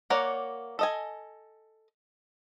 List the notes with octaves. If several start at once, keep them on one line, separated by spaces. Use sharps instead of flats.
A#3 A#4 C#5 D5 F#5
A4 D#5 G#5